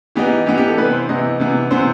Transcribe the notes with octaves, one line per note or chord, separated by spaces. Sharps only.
E3 B3 D#4 G4
E3 B3 D#4 G4
G4
A4
C3 E3 B3 B4
C5
C3 E3 B3 D#5
C3 E3 B3
C3 E3 B3 C5